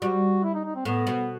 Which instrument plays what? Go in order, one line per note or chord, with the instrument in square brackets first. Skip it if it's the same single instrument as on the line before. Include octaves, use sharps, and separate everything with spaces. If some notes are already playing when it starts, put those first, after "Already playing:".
[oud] G3 [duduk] F#4
[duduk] E4
D#4
D#4
C4
[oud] A2 [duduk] B3
[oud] B2